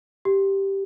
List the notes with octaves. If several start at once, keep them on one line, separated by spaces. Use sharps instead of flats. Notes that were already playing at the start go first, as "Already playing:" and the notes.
G4